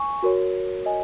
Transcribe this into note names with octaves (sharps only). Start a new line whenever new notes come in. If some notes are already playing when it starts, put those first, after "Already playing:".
Already playing: G#5 C#6
F#4 A#4 C#5
D#5 G#5